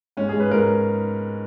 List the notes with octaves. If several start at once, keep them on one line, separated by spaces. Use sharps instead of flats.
G#2 C#4
G#4
G#2
B4
G#2 A#4